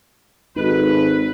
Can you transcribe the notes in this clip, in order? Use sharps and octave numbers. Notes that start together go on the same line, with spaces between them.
G#1 D#4 F#4 A4 B4